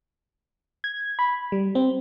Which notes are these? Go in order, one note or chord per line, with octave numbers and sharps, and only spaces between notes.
G#6
B5
G3
C4